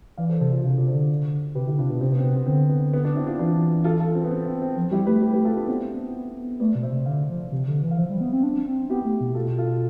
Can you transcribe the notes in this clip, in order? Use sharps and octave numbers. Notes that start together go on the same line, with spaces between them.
E3 D5 F5
A4 C5
C3 A4 C5
F4 A4
C3 D4 F4
C3 D5
A4 C5
D3
C3 G4 B4
D3 E4 G4
C3 D4 F4
B2 B3 D4
C3 C4
B3
C4
B3
C4
D3 C4
B3
B3
B3 D4
C4 E4
D4 F4
E3 D4 F4
F4 A4
F4 A4
C4
B3
C4
C4
C4
F3
G3 E4 G4
A3 G4 B4
G4 B4
G4 B4
F4 A4
B3 D4
B3 C4 E4
A3 B4 D5
B2
C5 E5
C3
D3 D5 F5
F3
C3
D3
E3
F5
F3 C5 E5
G3
B3
C4
D4
C4
B3 E4 G4
A3
B2
F4 A4
F4 A4